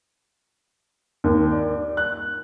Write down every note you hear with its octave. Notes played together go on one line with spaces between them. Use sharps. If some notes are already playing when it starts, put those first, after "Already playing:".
D#2
D5
F#6